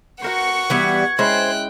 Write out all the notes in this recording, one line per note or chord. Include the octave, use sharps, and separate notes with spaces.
F#4 A#4 C5 F#5 C#6
E3 G3 B3 B4 G#6
G#3 C#4 E4 C5 G5 F#6